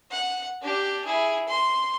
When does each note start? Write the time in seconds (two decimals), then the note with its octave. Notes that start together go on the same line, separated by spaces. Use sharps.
0.11 F#5
0.62 D4 G4
1.05 E4 G#4
1.48 C6